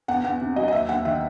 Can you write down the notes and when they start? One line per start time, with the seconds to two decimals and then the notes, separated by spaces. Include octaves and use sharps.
0.08 E2 F#5
0.24 E2 F#5
0.41 C3
0.56 F#3 D#5
0.68 D#5
0.73 D#2 E5
0.89 D#2 F#5
1.05 D#3 E5